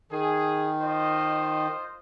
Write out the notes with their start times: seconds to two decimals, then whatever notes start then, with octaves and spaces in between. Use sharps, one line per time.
0.12 D#3 G#4
0.81 F4 C5 D#5